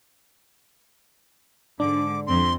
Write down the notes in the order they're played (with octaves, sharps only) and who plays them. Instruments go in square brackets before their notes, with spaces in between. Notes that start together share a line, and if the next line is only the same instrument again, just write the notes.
[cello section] G#2 D3 [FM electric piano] D4 [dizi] D6
[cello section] F2 C4 [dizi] C6